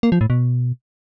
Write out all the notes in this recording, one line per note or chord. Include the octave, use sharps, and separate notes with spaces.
A#3
F3
A2
B2